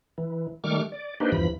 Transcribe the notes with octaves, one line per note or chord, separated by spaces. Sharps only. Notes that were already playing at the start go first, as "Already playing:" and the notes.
E3
D#3 G3 A3 C#6 D6 F6
D5
A#3 D4 D#4 G4 B4 C5
E2 G2 E3 F3 B5